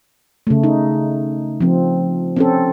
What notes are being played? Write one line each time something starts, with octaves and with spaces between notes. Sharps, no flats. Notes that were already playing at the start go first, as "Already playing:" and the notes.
C#3 A3
D#4
F3 C4
C4 C#4 A4